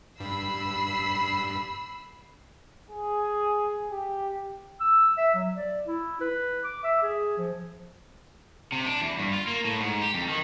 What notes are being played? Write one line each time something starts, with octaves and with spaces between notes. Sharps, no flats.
G2 B5 E6 C7
G#4
G4
E6
E5
F#3
D5
E4
B4
D6
E5
G#4
F3
C3
D4
E2
G2
F4
A#3
A2
G#2
G4
F2
D#3